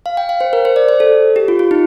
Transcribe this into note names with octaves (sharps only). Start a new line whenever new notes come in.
F5
G5
F5
C5
A#4
C5
D5
C5
A4
G4
F4
F4
D#4